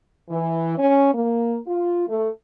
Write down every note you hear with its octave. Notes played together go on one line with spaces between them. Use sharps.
E3
C#4
A#3
F4
A3